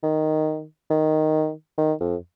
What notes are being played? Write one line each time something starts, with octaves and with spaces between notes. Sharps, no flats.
D#3
D#3
D#3
F2